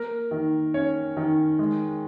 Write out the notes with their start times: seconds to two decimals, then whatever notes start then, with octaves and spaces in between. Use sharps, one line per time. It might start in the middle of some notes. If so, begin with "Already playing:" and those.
Already playing: A#3 A#4
0.31 D#3
0.74 C#4 C#5
1.17 D#3
1.59 G#3